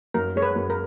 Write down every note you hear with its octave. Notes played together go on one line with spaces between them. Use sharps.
F#2 A#4
G#3 C#5
B4
F#2
A#4